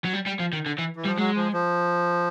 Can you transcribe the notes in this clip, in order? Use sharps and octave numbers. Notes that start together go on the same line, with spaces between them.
F#3
G3
G3
F3
D#3
D3
E3
E3
F3 G3
F#3 G#3
F3
F3